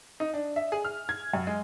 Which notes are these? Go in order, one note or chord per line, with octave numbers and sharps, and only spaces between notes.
D#4
D4
E5
G#4
F6
G#6
F#2
G#3